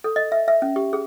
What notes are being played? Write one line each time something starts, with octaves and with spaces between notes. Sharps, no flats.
A4
D#5
E5
E5
C#4
G4
G#4